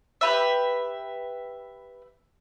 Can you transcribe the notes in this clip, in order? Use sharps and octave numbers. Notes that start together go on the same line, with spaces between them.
G4 B4 E5